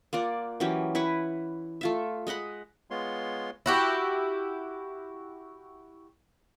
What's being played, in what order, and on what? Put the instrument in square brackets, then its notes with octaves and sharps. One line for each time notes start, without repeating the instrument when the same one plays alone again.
[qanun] A#3 F4 D5 F#5
E3 F#3 C#4 G4
E4 B4 F#5 C#6
A3 F4 E5
G#3 D#5 F#5 B5
[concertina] G#3 B3 F4 C#5 C6
[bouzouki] E4 F#4 G4